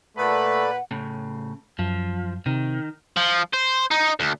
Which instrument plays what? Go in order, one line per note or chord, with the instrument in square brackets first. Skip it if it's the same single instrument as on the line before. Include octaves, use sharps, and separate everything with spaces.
[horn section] A#2 B4 [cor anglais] A3 [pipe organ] A4 D5 B5 [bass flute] F#5
[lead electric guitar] A2 C#3
[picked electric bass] F#2 [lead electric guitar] F3
[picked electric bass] C3 [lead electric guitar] D#3
[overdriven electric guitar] F3
C5
D#4
D2